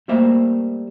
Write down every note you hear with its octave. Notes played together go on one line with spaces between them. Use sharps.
G3 A3 A#3 C5 E5